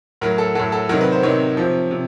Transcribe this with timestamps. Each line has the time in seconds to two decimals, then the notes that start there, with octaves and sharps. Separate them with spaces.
0.21 A2 F#3 A#4
0.38 A4
0.55 A2 F#3 A4
0.72 A4
0.89 C3 D#3 F#3 A#4
1.01 B4
1.12 C5
1.23 C3 D#3 F#3 C#5
1.57 C3 F3
1.91 C3